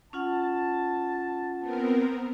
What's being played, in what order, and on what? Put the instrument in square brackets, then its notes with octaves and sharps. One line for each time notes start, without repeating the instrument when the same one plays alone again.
[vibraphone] C#4 F4 F#5 [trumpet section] A5
[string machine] B3 C4 A#4